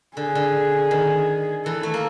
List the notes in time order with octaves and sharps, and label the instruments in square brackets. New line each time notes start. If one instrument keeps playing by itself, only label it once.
[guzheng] D3 [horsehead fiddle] G#4
[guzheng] D3
D#3
[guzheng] E3 [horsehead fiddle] A4
[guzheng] A3
A#3